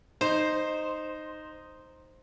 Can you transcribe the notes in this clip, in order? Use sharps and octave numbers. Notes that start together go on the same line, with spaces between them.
D#4 C5